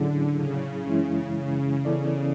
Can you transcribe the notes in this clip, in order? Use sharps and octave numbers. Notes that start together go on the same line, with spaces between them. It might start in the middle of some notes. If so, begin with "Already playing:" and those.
Already playing: A2 D3 F#3 C#4 E4 G#4
C#3
F#2 E3 G#3 C#4 E4
C#3
C#3 E3 B3 E4 A4 D5